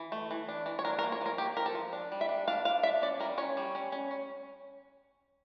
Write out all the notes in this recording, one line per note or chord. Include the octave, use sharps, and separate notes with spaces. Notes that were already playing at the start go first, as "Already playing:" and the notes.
Already playing: E3
A3
E3
D4
E3
C#5
D4 A#4
A#4
A#3
C#5
F3 A#4
A#3 G4
F3 A#4
A4
F3
D4
G3
E5
D4
D4 F5
D4 F5
D4 E5
C#4 D5
G3 A#4
C#4 C#5
G3
C#4
C#4
C#4